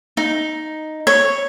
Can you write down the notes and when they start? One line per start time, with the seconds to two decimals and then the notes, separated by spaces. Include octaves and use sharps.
0.17 D#4
1.07 C#5